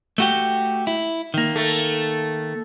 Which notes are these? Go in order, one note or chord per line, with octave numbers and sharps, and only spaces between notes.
A3 F#4 G4
E4
D#3 A#3
A3